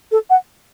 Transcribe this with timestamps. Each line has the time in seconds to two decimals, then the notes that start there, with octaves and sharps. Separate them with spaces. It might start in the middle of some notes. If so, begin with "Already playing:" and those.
0.12 A4
0.30 F#5